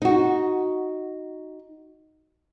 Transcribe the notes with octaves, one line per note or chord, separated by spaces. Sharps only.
D#4 F#4